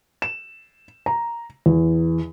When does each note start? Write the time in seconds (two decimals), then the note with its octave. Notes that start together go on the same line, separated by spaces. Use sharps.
0.22 E7
1.06 A#5
1.66 E2